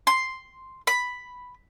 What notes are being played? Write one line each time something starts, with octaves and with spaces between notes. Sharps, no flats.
C6
B5